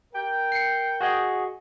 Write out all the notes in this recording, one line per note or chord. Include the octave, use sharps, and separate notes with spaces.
A#4 G5
C7 C#7
F#4 G#4 D#5